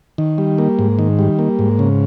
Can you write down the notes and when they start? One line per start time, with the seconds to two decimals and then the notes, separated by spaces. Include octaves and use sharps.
0.18 D#3
0.38 G3
0.58 A#3
0.79 G#2
0.99 D#3
1.19 G3
1.39 A#3
1.59 G#2
1.79 C#3